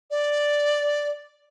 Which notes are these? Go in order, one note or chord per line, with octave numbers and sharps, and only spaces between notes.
D5